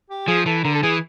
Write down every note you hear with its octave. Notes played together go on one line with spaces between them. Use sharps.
G4
F3 G#4
E3 A4
D3 A#4
A4
E3 G#4